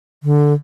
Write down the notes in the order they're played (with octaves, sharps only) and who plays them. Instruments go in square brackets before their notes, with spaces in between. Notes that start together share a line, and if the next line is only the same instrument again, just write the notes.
[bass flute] D3